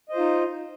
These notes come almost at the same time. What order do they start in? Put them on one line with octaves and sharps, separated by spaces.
D#5 C5 F4 D#4